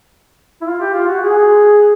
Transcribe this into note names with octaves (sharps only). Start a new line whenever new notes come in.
E4
F4
G4
F4
F#4
G#4